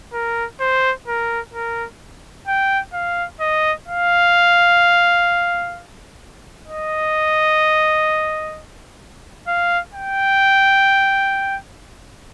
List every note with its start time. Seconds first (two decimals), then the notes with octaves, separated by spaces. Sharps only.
0.14 A#4
0.60 C5
1.08 A#4
1.54 A#4
2.48 G5
2.94 F5
3.40 D#5
3.88 F5
6.67 D#5
9.47 F5
9.94 G5